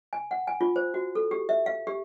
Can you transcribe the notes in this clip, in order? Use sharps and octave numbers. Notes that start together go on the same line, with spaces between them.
G#5
F#5
G#5
F4
C5
F#4
A4
G4
E5
F5
G4